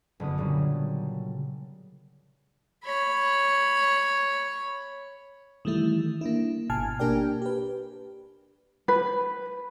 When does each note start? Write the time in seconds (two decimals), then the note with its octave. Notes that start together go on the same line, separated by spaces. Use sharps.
0.20 F#1 D3 B3 D#6
0.38 A#2 C#3 F#3 G3
2.85 C#5 B5
5.65 D#3 E3 G3 A3 E4
6.21 A#3 D4 E4
6.70 G#1 B2 G#5 A5 F6 G#6
6.99 A#3 D4 G4 A#4 D5 G5
7.42 G4 B4
8.88 B4